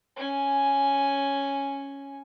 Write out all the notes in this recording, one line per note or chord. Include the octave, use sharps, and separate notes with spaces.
C#4 G#5